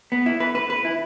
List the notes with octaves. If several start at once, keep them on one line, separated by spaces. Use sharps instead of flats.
B3
E4
B4
B4
B4
E4